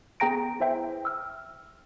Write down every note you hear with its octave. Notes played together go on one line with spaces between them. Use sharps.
B3 G#4 G5 A#5 A#6 D7
E4 B4 C5 E5 G5
E6 F6